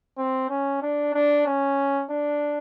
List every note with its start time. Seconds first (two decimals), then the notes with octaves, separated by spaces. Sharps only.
0.18 C4
0.50 C#4
0.82 D4
1.14 D4
1.46 C#4
2.10 D4